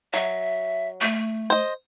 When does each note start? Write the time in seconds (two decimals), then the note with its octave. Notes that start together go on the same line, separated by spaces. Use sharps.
0.14 F#3 E5
1.01 A3
1.50 C5 D#5